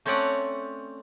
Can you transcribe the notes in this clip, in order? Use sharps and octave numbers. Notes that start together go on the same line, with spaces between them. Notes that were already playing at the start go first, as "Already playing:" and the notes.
A3 C4 C#4 C#5 D5 F#5